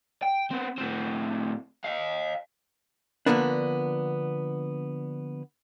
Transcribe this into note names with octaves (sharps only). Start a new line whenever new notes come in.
G5
B3 C4
A2 C4
D#5 F5
D3 E3 F3 A#3 B3 D4